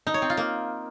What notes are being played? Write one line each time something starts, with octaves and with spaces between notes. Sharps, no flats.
D#4
C#5
C4
F4
A#3